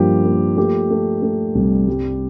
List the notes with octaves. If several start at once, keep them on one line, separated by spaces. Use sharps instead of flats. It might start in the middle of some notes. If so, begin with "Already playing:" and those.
Already playing: G2 F3 A#3 G4
A#3
A3 G4
A3
A3
C2
G3